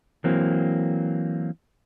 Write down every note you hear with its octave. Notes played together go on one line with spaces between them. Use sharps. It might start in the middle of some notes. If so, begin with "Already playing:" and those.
E3 F#3 A#3 C4